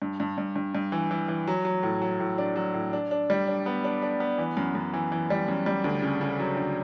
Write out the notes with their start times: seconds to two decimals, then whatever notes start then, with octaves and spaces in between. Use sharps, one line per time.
0.02 G2
0.20 G2
0.38 G2
0.56 G2
0.75 G2
0.92 E3
1.11 E3
1.28 E3
1.47 F#3
1.65 F#3
1.83 A2
2.02 F#3
2.20 A2
2.38 D4
2.56 F#3
2.74 A2
2.93 D4
3.11 D4
3.30 G3
3.48 D4
3.66 B3
3.84 D4
4.02 D4
4.20 B3
4.38 E3
4.57 F#2
4.75 F#2
4.94 E3
5.12 E3
5.30 G3
5.48 F#2
5.66 G3
5.84 D2
6.02 C#3
6.21 C#3
6.40 F#3
6.57 D2